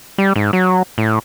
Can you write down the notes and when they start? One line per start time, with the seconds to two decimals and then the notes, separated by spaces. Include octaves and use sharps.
0.18 G3
0.36 G#2
0.53 F#3
0.98 A2